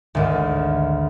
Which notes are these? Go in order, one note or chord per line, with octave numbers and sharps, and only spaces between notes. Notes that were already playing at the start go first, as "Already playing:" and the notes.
G#1 D2